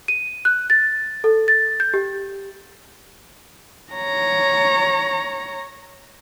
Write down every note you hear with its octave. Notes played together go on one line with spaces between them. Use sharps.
D#7
F#6
A6
A4
A6
G6
G4
C#5 A#5